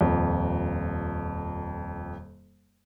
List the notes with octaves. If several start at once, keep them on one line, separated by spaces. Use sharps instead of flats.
D#1 F2